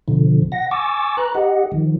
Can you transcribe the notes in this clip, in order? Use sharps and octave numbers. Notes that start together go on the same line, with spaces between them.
B2 D3 F3
F#5 A#6
G#5 C#6 D6 E6 A6
B4 A#5 F#6
G4 D#5 F#5
D#3 F3